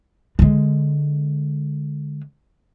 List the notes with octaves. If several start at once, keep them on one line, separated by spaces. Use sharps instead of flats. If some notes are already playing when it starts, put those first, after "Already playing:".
D3 G#3